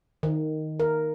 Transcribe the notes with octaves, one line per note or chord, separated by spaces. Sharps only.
D#3
A#4